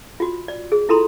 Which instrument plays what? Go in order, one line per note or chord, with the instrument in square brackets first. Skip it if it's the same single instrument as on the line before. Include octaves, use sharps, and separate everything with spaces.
[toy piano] F4 F#4
D5
G#4
E4 F4 A4 A#5 C6